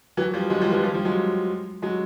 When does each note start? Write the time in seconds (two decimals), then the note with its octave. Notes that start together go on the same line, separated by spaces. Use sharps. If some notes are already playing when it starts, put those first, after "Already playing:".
0.17 E3 F#3
0.34 F3 G3
0.50 F#3 G#3
0.61 F3 G3
0.72 E3 F#3
0.83 F3 G3
0.94 F3 G3
1.05 F#3 G#3
1.82 F#3 G#3